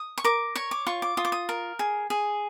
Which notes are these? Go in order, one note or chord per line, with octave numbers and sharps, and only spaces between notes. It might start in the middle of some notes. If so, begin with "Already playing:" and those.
Already playing: D#6
C#6
A#4 D6
C#5 C#6
D6
F4 C#6
D6
F4 D#6
D6
D#6
A#4
G#4
G#4